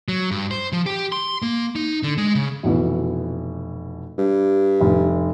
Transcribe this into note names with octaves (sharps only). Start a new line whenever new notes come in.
F#3
G2
C5
F3
G4
C6
A#3
D#4
D3
G#3
C#3
F1 B2 E3
G2
F1